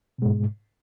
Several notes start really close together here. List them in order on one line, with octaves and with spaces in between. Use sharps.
B2 G#3 G#2